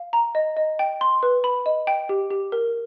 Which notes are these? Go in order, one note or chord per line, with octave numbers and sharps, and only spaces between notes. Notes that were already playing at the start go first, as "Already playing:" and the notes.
Already playing: F5
A#5
D#5
D#5
G5
C6
B4
B5
D#5
G5
G4
G4
A#4